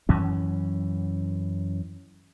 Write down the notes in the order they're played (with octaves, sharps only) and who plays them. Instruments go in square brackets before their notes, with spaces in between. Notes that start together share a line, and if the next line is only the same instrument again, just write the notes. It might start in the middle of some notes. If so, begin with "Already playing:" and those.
[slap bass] F#2 E3 C#4